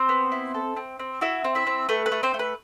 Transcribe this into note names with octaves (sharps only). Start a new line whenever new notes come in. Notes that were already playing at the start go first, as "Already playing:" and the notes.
Already playing: C4 C5
B3
E4
A4
C4
C4
E4 F#4 E5
C4
E4 E5
C4
A3 B4
B4
A3
C4 C5
A3
B4